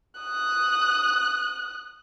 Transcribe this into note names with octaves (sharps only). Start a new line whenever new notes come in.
D#6 F#6